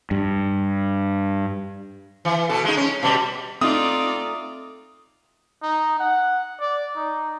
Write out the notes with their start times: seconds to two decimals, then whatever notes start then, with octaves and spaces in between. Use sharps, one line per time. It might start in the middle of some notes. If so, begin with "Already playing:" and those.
0.11 G2
2.25 E3
2.49 B2 A4
2.65 G#3 D#4
2.77 C#4
3.03 B2 G3
3.61 A3 C4 D#4 F4 D5 D#6
5.62 D#4
5.99 F#5
6.60 D5
6.96 D#4